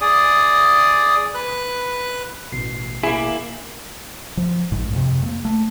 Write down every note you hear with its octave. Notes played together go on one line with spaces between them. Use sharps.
G#4 D5 D#6
B4 F#6
A1 B2 C7
A#3 E4 G#4
F3
A1 G#2
F2 C3
A3 A#3
A3